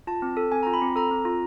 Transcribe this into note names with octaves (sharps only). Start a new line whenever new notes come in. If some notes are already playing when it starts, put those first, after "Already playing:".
F4 A5
C4
A4
C4 G#5
F4 A#5
B5
C4
A4 A#5
C4
F4